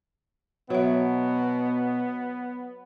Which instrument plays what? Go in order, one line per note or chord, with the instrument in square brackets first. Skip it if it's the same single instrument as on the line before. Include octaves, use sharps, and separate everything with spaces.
[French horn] B2 [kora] F#3 [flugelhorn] B3 [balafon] F#4 E5